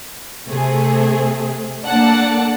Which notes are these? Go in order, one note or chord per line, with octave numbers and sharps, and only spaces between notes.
C3 A3 G#4
A#3 D4 A4 D5 F#5 A5